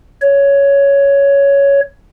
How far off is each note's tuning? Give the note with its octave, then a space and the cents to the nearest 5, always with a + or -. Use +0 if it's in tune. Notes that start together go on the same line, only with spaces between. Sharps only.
C#5 +10